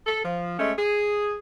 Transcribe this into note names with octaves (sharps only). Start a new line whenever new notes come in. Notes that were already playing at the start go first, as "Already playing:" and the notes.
A4
F3
G#3 A3 C#4
G#4